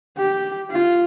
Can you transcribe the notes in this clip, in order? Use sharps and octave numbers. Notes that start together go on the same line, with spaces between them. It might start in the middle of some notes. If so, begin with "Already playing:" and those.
G4
F4